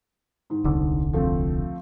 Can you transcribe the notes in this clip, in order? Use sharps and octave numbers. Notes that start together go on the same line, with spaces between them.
G#2 D#3
D#1 C2 D3
F3 A3 C4